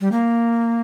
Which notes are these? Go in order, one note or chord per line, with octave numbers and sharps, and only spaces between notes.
G3
A#3